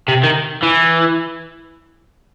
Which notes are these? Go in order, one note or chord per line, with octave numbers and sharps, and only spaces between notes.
C3
D#3
E3